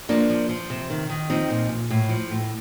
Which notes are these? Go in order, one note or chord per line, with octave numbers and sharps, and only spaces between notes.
F3 A#3 D4
F3
F3
C3
D#3
D#3
F3 C4 D#4
A#2
A#2
A2
F3
A2